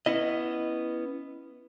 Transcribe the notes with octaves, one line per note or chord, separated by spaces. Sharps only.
B3 C#4 E4 D#5